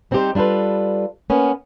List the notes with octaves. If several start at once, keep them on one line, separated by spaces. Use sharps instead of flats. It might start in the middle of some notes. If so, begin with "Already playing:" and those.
G3 C4 D#4 F#4 G4 C5
G3 D4 F4 A4 B4
A#3 B3 C#4